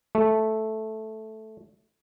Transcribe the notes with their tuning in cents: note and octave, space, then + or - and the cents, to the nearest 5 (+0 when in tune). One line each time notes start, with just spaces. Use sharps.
A3 -5